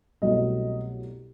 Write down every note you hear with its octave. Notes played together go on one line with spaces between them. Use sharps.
C2 B2 F#3 A3 D#5